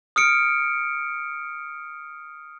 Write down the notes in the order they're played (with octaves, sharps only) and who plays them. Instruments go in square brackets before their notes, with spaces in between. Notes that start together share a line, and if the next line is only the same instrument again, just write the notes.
[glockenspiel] D#6 F6 C#7 D7